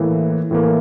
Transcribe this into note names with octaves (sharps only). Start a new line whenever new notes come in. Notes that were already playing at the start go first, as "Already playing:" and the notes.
Already playing: A2 E3 A#3
A2 E3 A#3